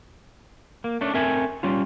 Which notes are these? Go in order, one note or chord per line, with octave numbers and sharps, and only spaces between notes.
A#3
A3 C#4 D4
A3 C4 A#4 E5 G#5
G3 C#4 F4